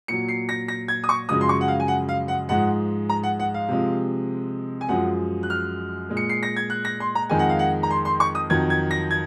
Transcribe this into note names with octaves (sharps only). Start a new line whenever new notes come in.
A#2 F#3 C#7
C7
A#6
A#6
G#6
D#6
C#6
F#2 C#3 F3 G#3 D#6
C6
C#6
F#5
F5
G#5
F#5
F5
F#5
G#2 F3 G#3 F#5
A#5
F#5
F#5
F5
C3 F3 G#3
G#5
F#2 F3 G#3 F#5
F#6
F6
A#2 G#3
C#7
C7
A#6
G#6
F#6
A#6
C6
A#5
F2 D#3 G#3 G#5
F#5
F5
F#5
A#5
C6
C6
C#6
D#6
F2 D#3 F#3 G#6
G#6
A#6
G#6